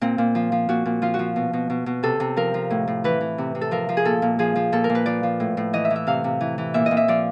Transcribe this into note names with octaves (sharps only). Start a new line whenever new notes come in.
A#2 C4
A#2
F3
F3
A#2 F#4
A#2
F3 F4
F#4
F3
B2
B2
B2
B2
C3 A4
C3
F3 A#4
F3
A2
A2
E3 B4
E3
C3
C3
A4
F3 A#4
F3
G#4
A#2 A4
A#2
F3 G#4
F3
A#2 A4
A#4
A#2
B4
F3 D5
F3
A2
A2
E3 D#5
E5
E3
E5
C3 F5
C3
E3
E3
A#2 E5
D#5
A#2
E5
F3 D5